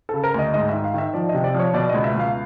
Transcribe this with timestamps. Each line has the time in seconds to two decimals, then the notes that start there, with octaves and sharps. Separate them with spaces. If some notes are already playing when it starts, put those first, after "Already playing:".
0.09 C#3 A4
0.24 A#4
0.34 D2 D#5
0.54 G#2 D#5
0.69 D#3 E5
0.84 F5
0.94 D#3 E5
1.14 F3 D5
1.29 D#5
1.34 C3
1.44 D5
1.54 F3 C#5
1.74 B2 D5
1.89 C#2 D#5
2.04 E5
2.15 C#2 F5